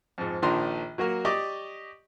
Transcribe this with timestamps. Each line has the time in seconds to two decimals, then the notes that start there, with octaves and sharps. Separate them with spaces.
0.18 F2 G#2
0.42 A#1 D#3 F3 D4 A#5 C6
0.98 F#3 A#3 F#4 A#4
1.25 G4 D5 D#5 C#6 D6